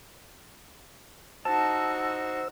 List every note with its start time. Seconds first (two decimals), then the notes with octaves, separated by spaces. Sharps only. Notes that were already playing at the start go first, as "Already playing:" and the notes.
1.45 D#4 F#4 C5 A5 E6